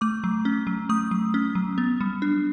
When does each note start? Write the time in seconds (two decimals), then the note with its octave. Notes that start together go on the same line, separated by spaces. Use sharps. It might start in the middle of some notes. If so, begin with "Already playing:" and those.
0.01 A3 D6
0.24 F#3
0.45 C#4
0.67 F#3
0.89 A3 D#6
1.11 F#3
1.34 C#4
1.55 F#3
1.78 B3
2.01 G3
2.22 D4